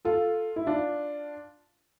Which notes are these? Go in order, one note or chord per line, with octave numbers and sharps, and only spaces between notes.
F4 A4
E4
D4 F4